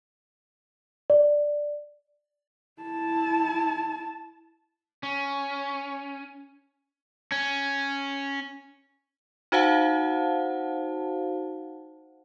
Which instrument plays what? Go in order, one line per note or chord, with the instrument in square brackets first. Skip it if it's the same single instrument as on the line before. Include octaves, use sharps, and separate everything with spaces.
[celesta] D5
[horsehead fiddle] E4 A5
[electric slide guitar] C#4
[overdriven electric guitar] C#4
[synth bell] D#4 F#4 C5 F5 F#5 A5